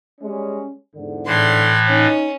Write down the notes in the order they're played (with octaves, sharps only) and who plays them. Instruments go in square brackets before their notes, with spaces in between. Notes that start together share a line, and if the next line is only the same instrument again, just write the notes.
[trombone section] G3 G#3 C#4
E2 G#2 D3
[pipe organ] A2 E3 [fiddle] C6
[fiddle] C#4 [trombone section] D#4